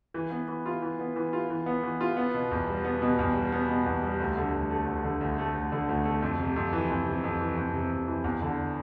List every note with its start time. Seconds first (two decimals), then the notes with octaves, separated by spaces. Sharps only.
0.14 E3
0.31 B3
0.48 E3
0.66 F4
0.82 E3
0.99 B3
1.16 E3
1.33 F4
1.50 E3
1.66 B3
1.83 E3
2.01 F4
2.17 B3
2.34 B2
2.51 E2
2.68 G3
2.85 B3
3.02 B2
3.19 E2
3.35 G3
3.52 B3
3.69 B2
3.86 E2
4.03 G3
4.20 D2
4.37 D3
4.53 D2
4.71 A3
4.87 D2
5.04 D3
5.21 D2
5.38 A3
5.54 D2
5.72 D3
5.88 D2
6.05 A3
6.22 F2
6.39 C3
6.56 F2
6.73 E3
6.90 F2
7.06 C3
7.24 F2
7.40 E3
7.57 F2
7.74 C3
7.91 F2
8.08 E3
8.24 E2
8.42 D3